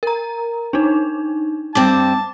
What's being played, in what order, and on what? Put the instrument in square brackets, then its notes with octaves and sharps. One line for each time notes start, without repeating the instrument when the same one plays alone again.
[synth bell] A#4 A#5
D4 D#4
[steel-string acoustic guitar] G2 C4 [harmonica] A5 [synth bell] D6